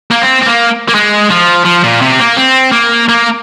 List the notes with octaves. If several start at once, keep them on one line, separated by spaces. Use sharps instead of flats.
A#3
C4
C4
A#3
A#3
G#3
F3
F3
A#2
C3
C4
A#3
C4
A#3
A#3